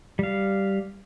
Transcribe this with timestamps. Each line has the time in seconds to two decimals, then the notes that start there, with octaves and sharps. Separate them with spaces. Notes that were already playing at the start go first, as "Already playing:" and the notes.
0.19 G3 F5